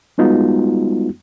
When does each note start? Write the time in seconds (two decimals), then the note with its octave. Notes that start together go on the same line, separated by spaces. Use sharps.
0.18 G3 G#3 B3 D#4 F4 F#4